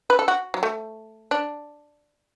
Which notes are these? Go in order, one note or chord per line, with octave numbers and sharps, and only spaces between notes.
B4
A4
F#4
F#3
A3
D4